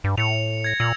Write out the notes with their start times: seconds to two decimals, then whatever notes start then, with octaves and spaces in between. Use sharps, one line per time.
0.04 G2
0.18 A2 C#7 F7
0.64 G#6 A#6
0.80 A#2 E6 F7